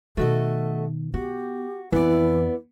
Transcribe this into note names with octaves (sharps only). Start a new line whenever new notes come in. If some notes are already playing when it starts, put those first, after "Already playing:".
B2 D#3 A3 F#4 A4 D#5
B3 F#4 G4
F2 E3 B3 E4 D5